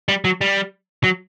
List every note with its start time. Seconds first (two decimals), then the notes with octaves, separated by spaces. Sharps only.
0.09 G3
0.25 F#3
0.41 G3
1.04 F#3